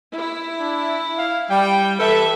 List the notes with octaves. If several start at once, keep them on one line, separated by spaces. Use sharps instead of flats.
E4
D4
F5
G3 G5
E3 A4 B4 E5